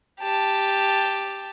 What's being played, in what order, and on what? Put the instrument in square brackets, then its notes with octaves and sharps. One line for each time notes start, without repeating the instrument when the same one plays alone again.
[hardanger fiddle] G4 A5